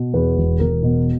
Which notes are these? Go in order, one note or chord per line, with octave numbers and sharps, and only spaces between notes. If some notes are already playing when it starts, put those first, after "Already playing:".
Already playing: B2
E2 B4
E1
E1 A#4
B2